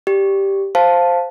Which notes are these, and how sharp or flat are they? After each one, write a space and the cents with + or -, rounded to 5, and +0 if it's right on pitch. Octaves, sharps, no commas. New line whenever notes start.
G4 +0 D5 +0
C5 +0 F5 +0 A5 +0